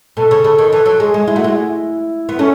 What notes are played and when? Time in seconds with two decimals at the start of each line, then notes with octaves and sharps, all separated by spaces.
0.17 B2 A4
0.31 C#3
0.44 C#3 A4
0.59 D#3
0.72 E3 A4
0.86 F#3
1.00 G#3 G#4
1.14 G#3
1.27 G#3 E4
1.36 A3 F#4
1.44 G#3 E4
2.29 B3
2.39 A3 C#4